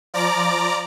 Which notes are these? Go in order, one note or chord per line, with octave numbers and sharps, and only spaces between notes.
F3 D5 A#5 D6